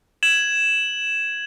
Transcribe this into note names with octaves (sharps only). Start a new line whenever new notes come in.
G#6 E7 F#7